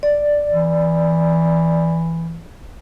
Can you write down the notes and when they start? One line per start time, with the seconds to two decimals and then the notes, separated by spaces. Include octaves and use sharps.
0.03 D5
0.52 E3